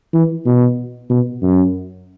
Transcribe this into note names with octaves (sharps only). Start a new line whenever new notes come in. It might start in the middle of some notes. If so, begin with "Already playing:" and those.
E3
B2
B2
F#2